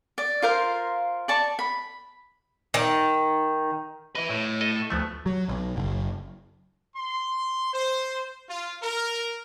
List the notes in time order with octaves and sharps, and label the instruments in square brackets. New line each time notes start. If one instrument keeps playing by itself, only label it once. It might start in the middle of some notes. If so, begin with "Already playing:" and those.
[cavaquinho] D5
F4 A#4 C5 F5
D5 A5 C#6
B5
[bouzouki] D#3
[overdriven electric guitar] E4 B4 [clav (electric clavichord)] D#5
[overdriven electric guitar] A2 [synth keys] C#5
[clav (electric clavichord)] A4 D#5
A4
[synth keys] D2 F3 C#6 [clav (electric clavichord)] A3 B3
[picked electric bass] F#3
B1
F#1
[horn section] C6
C5
F4
A#4